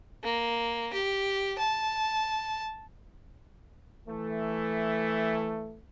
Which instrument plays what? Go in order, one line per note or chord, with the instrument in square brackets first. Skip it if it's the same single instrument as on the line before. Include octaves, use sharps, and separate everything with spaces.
[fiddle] A#3
G4
A5
[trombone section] E3 A3